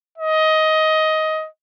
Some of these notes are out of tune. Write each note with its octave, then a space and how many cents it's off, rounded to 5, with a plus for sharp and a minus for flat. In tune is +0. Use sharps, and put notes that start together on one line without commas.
D#5 +15